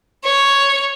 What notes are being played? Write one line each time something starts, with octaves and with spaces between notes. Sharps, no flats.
C#5